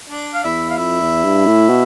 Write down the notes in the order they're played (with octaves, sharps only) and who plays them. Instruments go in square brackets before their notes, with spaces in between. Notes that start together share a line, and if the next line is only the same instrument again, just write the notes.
[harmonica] D4 D5
F5
[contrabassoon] E2 [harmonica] E4 E5
[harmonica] F5
[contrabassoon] F2 [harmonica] E4 E5
[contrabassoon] E2
G2
A2
B2